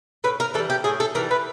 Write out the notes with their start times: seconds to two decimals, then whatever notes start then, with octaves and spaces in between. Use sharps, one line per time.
0.24 A2 B4
0.40 A#4
0.54 E3 A4
0.59 G3
0.70 G4
0.84 A2 G#4
1.00 A4
1.15 E3 A#4
1.18 G3
1.31 B4